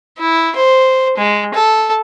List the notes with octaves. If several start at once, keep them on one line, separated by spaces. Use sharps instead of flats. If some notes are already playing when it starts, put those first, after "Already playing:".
E4
C5
G#3
A4